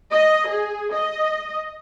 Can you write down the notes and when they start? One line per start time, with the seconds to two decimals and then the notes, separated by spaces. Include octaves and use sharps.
0.12 D#5
0.49 G#4
0.93 D#5